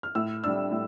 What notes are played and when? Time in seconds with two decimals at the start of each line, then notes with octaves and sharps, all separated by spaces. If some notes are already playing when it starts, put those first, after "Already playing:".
0.03 F6
0.15 A2 E6
0.43 G3 D4 E6
0.71 A2